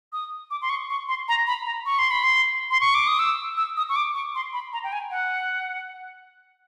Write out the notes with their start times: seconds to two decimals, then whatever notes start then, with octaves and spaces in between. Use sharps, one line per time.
0.13 D#6
0.51 D6
0.62 C6
0.70 C#6
0.90 C#6
1.08 C6
1.28 A#5
1.47 B5
1.65 A#5
1.86 C#6
1.99 C6
2.11 B5
2.24 C6
2.71 C6
2.81 C#6
2.95 D6
3.07 D#6
3.19 E6
3.57 E6
3.77 D#6
3.89 C#6
3.96 D6
4.15 C#6
4.35 C6
4.53 B5
4.73 A#5
4.84 G5
4.92 G#5
5.11 F#5